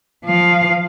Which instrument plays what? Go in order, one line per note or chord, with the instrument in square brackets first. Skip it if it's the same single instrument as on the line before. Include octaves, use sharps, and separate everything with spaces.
[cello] F3 F5